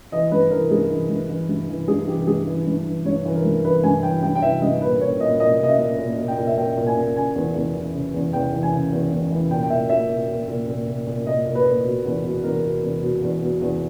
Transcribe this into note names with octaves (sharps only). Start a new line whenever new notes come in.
E3 D#5
G2 B4
E3 A#4
G2 G#4
E3
G2
E3
G2
E3
G2 G#4
E3 G4
G2 G#4
E3
G2
E3
G2 C#5
E3
A#4
G2
E3 B4
G2 G#5
E3 G5
G2 G5
G5
E3 E5
G2 D#5
A#2 B4
A#2 C#5
A#2 D#5
A#2 D#5
A#2 D#5
E5
A#2
A#2
A#2
G5
A#2
E5
A#2 G5
A#2
G#5
A#2
C#3 G#5
E2
E2
E3
C#3
E2
E2 G5
E3
G#5
C#3
E2
E2
E3
A#2 G5
G5
A#2 E5
A#2 E5
A#2
A#2
A#2
A#2
A#2
A#2
A#2 D#5
A#2
B4
A#2
B2
E2
B2
E2 A#4
B2
E2
B2
E2
B2
E2